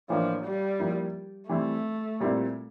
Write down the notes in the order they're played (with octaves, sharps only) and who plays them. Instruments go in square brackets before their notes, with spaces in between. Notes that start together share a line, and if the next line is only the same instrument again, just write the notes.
[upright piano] A2 E3 A#3 D4 [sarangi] F3
[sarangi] G3
[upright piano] F3 A#3 E4
[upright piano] E3 G3 C4 E4 [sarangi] A3
[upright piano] A#2 G3 C4 E4